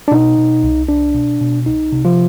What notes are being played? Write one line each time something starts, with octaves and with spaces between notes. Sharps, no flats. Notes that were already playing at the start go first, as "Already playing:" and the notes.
D4
B2 D#4
B2
C2
C2 D4
B2
B2
C2 D#4
C3
F3 F4